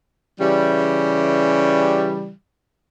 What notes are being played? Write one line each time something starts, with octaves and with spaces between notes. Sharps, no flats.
C#3 E3 G3